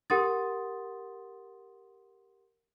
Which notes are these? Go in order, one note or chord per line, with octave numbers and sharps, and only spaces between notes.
G4 A#4 F#5 C6 D#6 A6